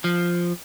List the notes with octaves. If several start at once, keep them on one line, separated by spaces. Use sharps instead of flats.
F3